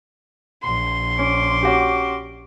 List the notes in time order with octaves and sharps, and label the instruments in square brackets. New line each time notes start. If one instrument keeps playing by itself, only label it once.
[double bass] A#1 [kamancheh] C6
[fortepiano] C#4 [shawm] D6
[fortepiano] C#4 F#4 G4